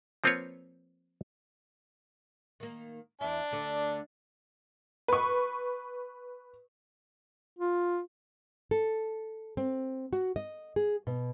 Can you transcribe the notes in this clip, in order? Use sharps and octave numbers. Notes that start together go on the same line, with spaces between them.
F3 A#3 C4 F4 B4 C#5
D#3 A#3
E2 D4 E4
D2 D3
B4 C#6
F4
A4
C4
F#4
D#5
G#4
B2